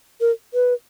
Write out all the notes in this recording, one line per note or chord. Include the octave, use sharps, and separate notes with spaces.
A#4
B4